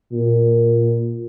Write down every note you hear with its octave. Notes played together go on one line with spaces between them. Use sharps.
A#2